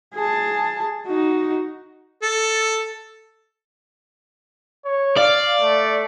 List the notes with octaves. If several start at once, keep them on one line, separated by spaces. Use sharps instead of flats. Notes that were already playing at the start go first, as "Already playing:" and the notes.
G#4 A5
D#4 F#4
A4
C#5
D5 F5
A3